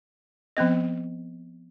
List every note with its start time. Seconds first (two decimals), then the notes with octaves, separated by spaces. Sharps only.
0.57 F3 B3 C4 D#5